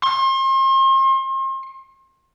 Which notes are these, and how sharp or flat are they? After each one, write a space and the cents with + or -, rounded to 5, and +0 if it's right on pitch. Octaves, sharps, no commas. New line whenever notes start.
C6 +40